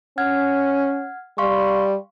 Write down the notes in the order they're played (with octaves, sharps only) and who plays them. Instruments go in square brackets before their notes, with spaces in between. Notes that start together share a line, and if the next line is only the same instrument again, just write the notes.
[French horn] C#4 [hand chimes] F#5 F6 G#6
[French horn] G3 [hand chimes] F5 C6 C#6